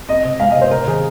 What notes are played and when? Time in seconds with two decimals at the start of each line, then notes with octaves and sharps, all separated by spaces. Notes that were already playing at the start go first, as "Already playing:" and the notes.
0.09 C4 D#5
0.25 C3
0.40 G#3 F5
0.51 D#5
0.56 C3
0.61 C5
0.71 C3 A#4
0.87 D#3 G#4